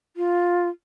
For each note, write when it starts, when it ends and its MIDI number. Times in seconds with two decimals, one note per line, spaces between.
0.16 0.69 65